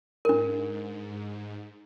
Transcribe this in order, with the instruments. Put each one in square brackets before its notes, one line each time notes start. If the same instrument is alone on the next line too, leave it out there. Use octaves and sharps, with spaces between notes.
[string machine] G#2 [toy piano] D4 A#4